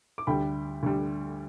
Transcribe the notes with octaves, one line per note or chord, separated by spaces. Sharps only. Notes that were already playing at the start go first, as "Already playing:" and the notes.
D6
D2 D3 G3 G5 B5
D2 D3 G3